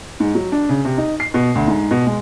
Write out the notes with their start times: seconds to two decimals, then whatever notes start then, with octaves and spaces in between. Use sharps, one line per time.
0.20 G#2
0.35 F#3
0.52 D4
0.69 C#3
0.85 C3
0.98 D#4
1.20 C7
1.34 B2
1.55 D2
1.67 G#2
1.91 B2
2.06 G#3